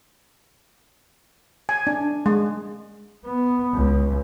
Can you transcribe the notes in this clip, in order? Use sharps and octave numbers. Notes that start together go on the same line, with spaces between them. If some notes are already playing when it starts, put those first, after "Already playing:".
G#5
D4
G#3
B3
C#2